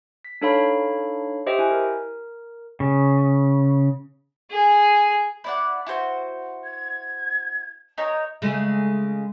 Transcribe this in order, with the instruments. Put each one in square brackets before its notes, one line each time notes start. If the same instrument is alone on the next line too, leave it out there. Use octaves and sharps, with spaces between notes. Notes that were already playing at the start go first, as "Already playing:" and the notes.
[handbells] B6
D4 D#4 A4 C#5 F5 B5
G4 C5 D#5 E5 G5
E4 G#5
A#4
[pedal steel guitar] C#3
[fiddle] G#4
[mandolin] E4 D5 F#5
E4 F#4 C5
[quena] G#6
[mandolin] D#4 A#4 C#5
[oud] C#3 G#3 A3